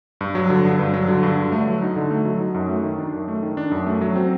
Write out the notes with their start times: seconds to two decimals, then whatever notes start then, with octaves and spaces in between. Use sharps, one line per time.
0.21 G2
0.35 F#3
0.50 D3
0.65 G2
0.79 G2
0.94 F#3
1.08 D3
1.23 G2
1.37 D3
1.52 A3
1.67 F#3
1.82 D#4
1.96 D3
2.11 A3
2.25 F#3
2.40 D#4
2.54 F#2
2.69 A3
2.84 D#3
2.98 D4
3.13 F#2
3.28 A3
3.43 D#3
3.57 D4
3.71 F#2
3.86 A3
4.01 F#3
4.16 C4